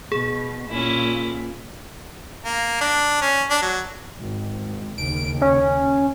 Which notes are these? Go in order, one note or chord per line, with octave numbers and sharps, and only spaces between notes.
B2 G#4
A#2 C#4 E4
A#3
D4
C#4
D4
F#3
G#1 G#2
D#2 C#3 D7
C#4